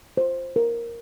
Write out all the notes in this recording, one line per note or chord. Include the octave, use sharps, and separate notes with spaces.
C5
A#4